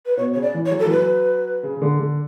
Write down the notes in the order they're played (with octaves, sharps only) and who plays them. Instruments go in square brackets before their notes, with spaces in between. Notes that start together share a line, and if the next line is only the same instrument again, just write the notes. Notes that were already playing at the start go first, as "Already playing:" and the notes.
[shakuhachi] B4
[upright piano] B2 [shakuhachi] C#5
[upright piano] C#3 [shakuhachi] C#5
[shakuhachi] D5
[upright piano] E3
[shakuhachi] C#5
[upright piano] F#3
[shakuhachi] A4
[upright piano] E3
[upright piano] F#3 [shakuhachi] B4
[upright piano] C#3
C#3
D3
D3